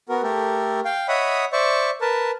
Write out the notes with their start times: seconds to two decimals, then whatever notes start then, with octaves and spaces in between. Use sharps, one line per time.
0.09 B3 F#4 A#4
0.23 A3 G4 A4 A#4
0.85 F5 G5
1.08 C#5 D#5 E5 F#5 B5 D#6
1.53 C5 D5 E5 C#6
2.01 A#4 B4 A5